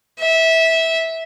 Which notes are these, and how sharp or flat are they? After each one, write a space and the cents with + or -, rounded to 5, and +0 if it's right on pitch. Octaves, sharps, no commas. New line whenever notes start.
E5 -15